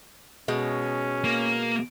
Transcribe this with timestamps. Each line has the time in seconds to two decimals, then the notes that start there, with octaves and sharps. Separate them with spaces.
0.48 B2 G#3 C#4
1.24 A#3